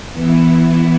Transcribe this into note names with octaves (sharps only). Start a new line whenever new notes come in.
E3 B3 E4